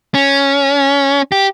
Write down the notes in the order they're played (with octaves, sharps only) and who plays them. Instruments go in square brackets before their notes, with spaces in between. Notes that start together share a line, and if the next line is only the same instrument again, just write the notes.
[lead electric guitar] C#4
G4